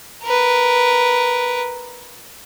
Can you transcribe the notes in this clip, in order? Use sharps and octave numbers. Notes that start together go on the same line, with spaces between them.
A#4 B4